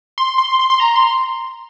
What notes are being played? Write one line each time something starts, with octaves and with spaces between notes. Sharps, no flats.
C6
C6
C6
C6
A#5
C6